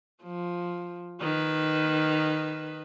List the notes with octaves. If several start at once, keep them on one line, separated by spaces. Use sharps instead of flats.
F3
D#3 B4